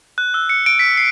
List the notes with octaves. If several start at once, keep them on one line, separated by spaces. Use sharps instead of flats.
F#6
E6
C#7
D7
B6
C7